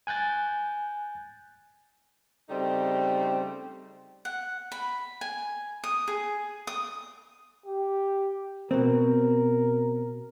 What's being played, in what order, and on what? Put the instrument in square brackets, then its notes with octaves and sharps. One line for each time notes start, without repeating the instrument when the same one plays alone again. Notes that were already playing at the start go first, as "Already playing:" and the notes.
[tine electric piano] G#5 F#6 G6 A6
[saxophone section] C#3 G3 A3 C4 D#4
[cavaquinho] F#5
B5
G#5
D#6
G#4
D#6
[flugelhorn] G4
[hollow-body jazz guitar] B2 C4 [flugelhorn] A#4